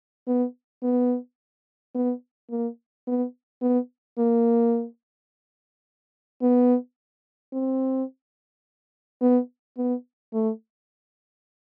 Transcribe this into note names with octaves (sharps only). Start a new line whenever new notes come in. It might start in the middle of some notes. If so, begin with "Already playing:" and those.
B3
B3
B3
A#3
B3
B3
A#3
B3
C4
B3
B3
A3